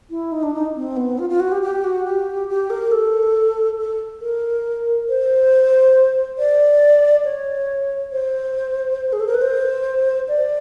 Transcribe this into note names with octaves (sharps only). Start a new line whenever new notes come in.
E4
D#4
D4
D#4
C4
B3
F4
F4
F#4
G4
G4
F#4
G4
G4
A#4
A4
A4
A#4
C5
D5
C#5
C5
G#4
A4
A#4
B4
C5
D5